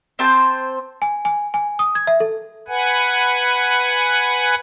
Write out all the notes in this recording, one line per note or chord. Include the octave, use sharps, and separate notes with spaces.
C4 C5 A5
G#5
G#5
G#5
D#6
G#6
E5
A4
B4 F#5 G#5